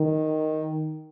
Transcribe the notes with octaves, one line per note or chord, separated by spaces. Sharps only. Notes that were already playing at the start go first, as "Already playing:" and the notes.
Already playing: D#3